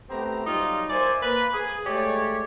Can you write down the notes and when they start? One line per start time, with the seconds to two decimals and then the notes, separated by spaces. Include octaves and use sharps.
0.10 A3 B3 C4 G4 A#5
0.47 F#3 G3 D#4 F4
0.90 A#4 C5 D5 E5 G#5
1.23 A#3 B4
1.54 G#4
1.86 G#3 A3 G4 C#5 D5